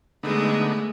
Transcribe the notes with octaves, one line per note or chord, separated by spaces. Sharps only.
D3 G#3 A3 B3 D#4